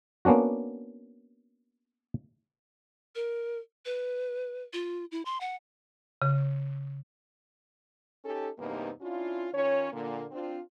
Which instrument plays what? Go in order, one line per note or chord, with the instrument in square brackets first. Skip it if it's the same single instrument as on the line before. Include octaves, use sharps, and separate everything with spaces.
[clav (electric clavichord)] A#3 B3 C#4 D4 F#4
[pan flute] A#4
B4
F4
E4
C6
F#5
[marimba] C#3
[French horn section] C#4 D#4 G4 A4
E2 G2 C3 A#3 B3 D#4
C#4 D4 E4 F4
D#3 C#4 F4 C#5
A#2 D3 A#3
C4 D4 F4